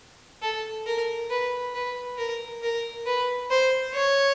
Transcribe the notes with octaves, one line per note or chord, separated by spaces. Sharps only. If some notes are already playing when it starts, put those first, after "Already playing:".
A4
A#4
B4
B4
A#4
A#4
B4
C5
C#5